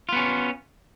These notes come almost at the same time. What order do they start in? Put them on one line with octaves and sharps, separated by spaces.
F4 B3 C#4